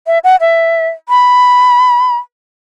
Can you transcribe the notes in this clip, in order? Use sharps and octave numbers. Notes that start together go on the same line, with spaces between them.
E5
F#5
E5
B5